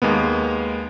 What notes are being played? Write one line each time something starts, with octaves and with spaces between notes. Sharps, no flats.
D#2 G#3 A#3 B3